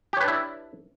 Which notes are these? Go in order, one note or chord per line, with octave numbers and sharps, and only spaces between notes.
D4 E4 G4 B4 C#5